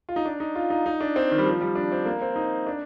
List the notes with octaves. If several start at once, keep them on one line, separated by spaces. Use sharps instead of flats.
F4
D#4
D4
D#4
F4
D#4
D#4
D4
C4
D#3
G3
F3
G3
D4
C4
A#3
C4
D#4
D4